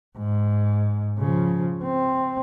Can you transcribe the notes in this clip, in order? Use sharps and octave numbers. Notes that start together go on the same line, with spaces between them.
G#2
C#3 F3
C4